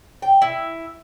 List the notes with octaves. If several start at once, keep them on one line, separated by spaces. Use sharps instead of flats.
G5
E4